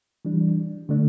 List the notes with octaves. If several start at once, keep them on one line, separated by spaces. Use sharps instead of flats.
E3 G3 D4
D3 A3 D4